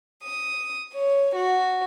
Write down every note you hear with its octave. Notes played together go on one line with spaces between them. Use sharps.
D#6
C#5
F#4